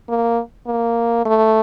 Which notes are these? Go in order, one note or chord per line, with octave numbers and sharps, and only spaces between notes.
A#3
A#3
A3